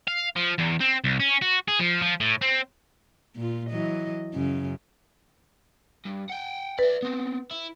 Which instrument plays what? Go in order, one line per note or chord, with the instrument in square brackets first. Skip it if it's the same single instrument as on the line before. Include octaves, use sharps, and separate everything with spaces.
[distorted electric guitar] F5
F3
E2
C4
C2
C#4
F#4
G#4
F3
F3
A2
C4
[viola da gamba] A#2 F4
E3 F#3 D#5
F#2 C#3
[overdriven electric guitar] G2
F#5 G5
[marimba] B4 [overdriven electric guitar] D5 E5
[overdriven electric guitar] B3 C4
E4